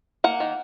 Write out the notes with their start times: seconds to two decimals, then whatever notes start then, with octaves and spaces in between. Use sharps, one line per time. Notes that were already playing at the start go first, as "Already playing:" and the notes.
0.24 A#3 F#5
0.40 D#3